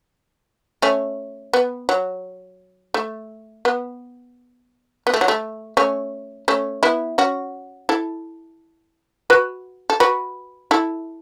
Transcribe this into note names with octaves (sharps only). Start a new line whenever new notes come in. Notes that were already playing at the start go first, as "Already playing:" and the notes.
A3 C#4
B3
F#3
A3
B3
B3
A3
F#3
A3
A3 C#4
A3 C#4
B3 E4
C#4 F#4
E4 A4
F#4 B4
A4
F#4 B4
E4 A4